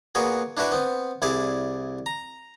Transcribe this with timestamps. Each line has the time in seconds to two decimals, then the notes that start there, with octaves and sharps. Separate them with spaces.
0.15 A#2 B3 F#4 G#4
0.57 D4 E4 F#4 B4 E5
0.72 B3 C4
1.22 C2 E4 G#4 D5
2.06 A#5